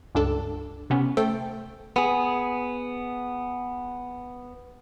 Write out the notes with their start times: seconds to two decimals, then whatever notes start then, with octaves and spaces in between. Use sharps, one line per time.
0.15 C#2 G2 D4 A4
0.90 C3 B3 C#4
1.17 A3 A4 C5 G5
1.96 B3 G#4